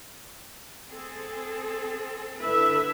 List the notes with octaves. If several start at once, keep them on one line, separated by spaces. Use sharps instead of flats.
C4 G#4 A4
D3 E4 A4 B4 E5